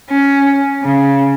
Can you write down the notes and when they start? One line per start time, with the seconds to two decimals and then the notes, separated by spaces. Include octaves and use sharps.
0.10 C#4
0.84 C#3